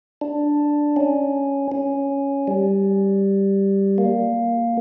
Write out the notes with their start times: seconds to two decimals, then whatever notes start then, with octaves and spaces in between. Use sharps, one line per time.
0.21 D4
0.96 C#4
1.72 C#4
2.47 G3
3.98 A#3